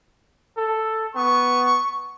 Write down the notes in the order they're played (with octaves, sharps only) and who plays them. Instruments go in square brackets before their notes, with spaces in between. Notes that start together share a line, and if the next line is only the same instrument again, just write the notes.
[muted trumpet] A4
[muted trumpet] B3 [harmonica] C#6